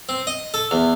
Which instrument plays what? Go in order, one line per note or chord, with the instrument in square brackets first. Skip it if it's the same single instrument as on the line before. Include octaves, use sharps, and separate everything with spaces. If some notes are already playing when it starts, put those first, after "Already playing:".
[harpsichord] C4
D#5
A4
E2